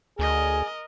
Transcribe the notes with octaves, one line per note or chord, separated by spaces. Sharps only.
D2 G#4 A#4 D#5